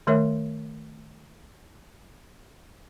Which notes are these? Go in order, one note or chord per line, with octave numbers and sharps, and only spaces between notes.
D#3 A3 A#4 C#5 E5